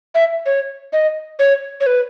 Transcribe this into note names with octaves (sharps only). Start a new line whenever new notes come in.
E5
C#5
D#5
C#5
C#5
B4